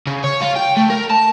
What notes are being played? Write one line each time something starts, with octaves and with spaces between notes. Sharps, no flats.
C#3
C#5
F4
G5
A3
A#4
A5